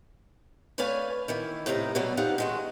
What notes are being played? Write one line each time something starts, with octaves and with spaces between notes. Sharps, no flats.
A3 B4 C#5 D5 F5 G#5
D#3 E3 E4
A2 C3 D#4 A#4 A#5
B2 D3 F#3 G3
F2 E3 G3 D#4 F5 F#5
D#3 G#3 F#4